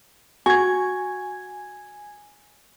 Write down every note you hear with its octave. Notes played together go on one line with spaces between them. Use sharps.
F#4 G#5 G#6